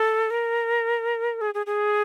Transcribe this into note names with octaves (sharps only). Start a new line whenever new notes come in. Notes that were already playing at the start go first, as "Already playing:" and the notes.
Already playing: A4
A#4
G#4
G#4
G#4